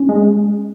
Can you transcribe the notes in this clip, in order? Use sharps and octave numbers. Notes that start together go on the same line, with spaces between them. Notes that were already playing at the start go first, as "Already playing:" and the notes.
Already playing: C#4
G#3